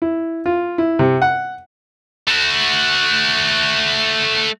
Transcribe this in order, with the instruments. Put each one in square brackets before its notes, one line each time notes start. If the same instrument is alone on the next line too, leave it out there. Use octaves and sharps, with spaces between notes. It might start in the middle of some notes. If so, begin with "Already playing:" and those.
[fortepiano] E4
F4
E4
C3
F#5
[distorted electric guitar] A3 F#4